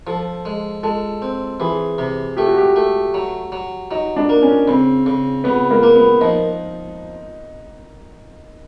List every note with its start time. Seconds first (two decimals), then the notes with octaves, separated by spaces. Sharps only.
0.07 F3 A4
0.45 G#3
0.83 G#3 A4
1.22 C4
1.60 E3 G#4
1.98 C3
2.37 A3 G4
2.47 F#4
2.57 G4
2.76 A3
3.14 F#3
3.52 F#3
3.91 F#3 D#4
4.16 D4
4.29 A#3
4.42 C#4
4.68 C#3 C4
5.06 C#3
5.44 C#3 B3
5.71 A#3
5.83 A#3
5.96 B3
6.21 F3 D#4